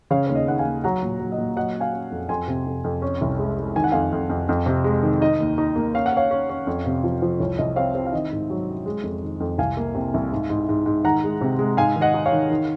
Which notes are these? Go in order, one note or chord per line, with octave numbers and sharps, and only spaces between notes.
C#3 C#5 F5
D#2 C#5
D#5
D#2 F#5
F5 G#5
D#2
F#3 F#5 A#5
A#2
F#3
D#5
A#2
F#3 D#5 F#5
C#4
F5 G#5
C#4
F2
F2 G#5 C6
C3
F2
F2
C#4
C2
G#3
G#3
D#3 G#5
F#5
F2 F5 G#5
F2
F2
F2
C3
G#3
D#3
D#4 D#5
D#2
D#4
A#3
C#4 F5
F#5
C#4 C#5 F5
C#4
C#4
F2
C3
F3
F3
C2 C#5
C2 D#5
C4 C#5 F5
C4
F5
D#3 D#5
G#2
F#3
C#4
G#3
F2
D#3
F2
C2 F5 G#5
A#3
C3
C2
G#2
G#2
G#2
G#2
D#3 F#5 A#5
G#3
C3
G#3
G#2 F5 G#5
D#3
D#5 F#5
D#4
C#5 F5
D#3
D#3